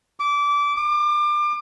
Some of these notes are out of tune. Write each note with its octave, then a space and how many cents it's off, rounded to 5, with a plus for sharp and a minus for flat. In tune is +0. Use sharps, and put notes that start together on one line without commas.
D6 -20
D6 +30